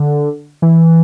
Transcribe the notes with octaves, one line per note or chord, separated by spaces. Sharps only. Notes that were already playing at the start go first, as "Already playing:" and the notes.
Already playing: D3
E3